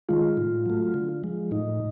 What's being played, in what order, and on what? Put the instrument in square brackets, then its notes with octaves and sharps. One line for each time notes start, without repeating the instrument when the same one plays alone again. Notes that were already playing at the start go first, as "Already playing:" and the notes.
[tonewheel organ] D#3 G#3 F4
A2
F#3 A3
D3
F3 G#3
A2 D#4